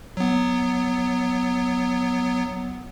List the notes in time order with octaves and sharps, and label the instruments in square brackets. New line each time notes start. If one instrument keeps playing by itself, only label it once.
[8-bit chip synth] F#3 B3